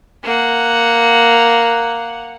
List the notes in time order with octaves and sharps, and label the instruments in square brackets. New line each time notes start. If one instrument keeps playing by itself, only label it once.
[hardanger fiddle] A#3 F#5